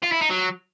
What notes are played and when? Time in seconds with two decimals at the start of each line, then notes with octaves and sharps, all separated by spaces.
0.03 F4
0.12 E4
0.21 D#4
0.30 F#3